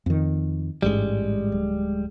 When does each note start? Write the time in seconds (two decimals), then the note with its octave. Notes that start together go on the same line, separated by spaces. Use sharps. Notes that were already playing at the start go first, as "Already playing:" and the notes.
0.06 F2 D#3
0.83 A1 G#2 G3 G#3
1.52 D1